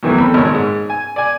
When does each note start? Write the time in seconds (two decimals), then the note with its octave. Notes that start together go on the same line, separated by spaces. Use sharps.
0.03 E2 D#3 E3 F#3 A3
0.18 E2 C4 A4 B5
0.34 G#1 A#2 C#5
0.54 G#2
0.90 G#5
1.16 D5 G#5